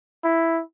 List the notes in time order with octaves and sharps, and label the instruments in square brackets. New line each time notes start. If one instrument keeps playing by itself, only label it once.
[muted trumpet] E4